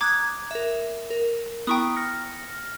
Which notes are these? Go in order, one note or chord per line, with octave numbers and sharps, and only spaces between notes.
A#5 D6 D#6 F#6 G#6
A#4 E5
A#4
B3 E4 G5 A#5 C#6 D#6
F6 A#6 C#7